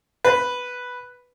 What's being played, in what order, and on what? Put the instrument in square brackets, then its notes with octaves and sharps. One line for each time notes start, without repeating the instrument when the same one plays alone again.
[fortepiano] B4